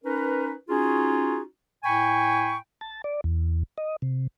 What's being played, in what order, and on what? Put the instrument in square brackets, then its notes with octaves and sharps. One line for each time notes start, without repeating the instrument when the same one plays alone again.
[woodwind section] C#4 D#4 A#4 B4
C#4 D#4 F4 F#4 G#4
A2 G5 G#5 B5 C#6
[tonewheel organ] A5
D5
E2
D#5
C3